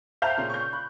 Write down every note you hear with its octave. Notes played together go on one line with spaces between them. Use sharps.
C5 E5 F5 G5 A5 A#5 G6 F7
A#2 C#3
C#6 G6
B5 F#6